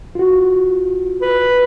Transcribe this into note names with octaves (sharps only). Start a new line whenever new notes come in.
F4 F#4
B4